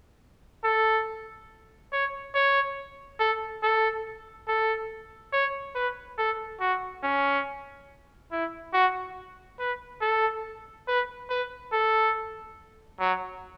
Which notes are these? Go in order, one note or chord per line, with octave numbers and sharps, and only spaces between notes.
A4
C#5
C#5
A4
A4
A4
C#5
B4
A4
F#4
C#4
E4
F#4
B4
A4
B4
B4
A4
F#3